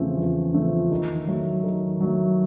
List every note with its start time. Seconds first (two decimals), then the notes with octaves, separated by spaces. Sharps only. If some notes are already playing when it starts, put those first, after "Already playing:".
Already playing: E2 C#3 F3 A3 C4
0.17 E2
0.54 C#3 F3 A3 C4
0.91 D#3
1.27 F#3 A3
1.64 D#3
2.00 F#3 A3